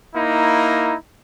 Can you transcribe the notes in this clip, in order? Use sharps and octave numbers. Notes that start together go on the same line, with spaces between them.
A#3 D#4 E4